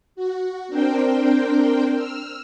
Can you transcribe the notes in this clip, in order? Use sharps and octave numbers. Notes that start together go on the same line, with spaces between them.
F#4
C4 D4 A#4 C5 G5
E6 F6